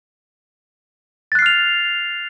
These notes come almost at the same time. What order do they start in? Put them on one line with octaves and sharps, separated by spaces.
A6 F#6 C7 F6 F7